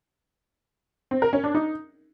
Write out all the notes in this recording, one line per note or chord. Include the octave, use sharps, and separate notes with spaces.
C4
A#4
C#4
D4
D#4